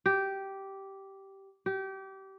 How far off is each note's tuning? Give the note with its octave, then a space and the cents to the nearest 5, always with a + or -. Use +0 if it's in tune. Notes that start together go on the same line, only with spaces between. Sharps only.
G4 -10
G4 -25